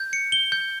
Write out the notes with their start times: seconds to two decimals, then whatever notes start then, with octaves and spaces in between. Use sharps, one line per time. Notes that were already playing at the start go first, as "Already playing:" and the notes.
Already playing: G6
0.13 C#7
0.32 G7
0.52 G6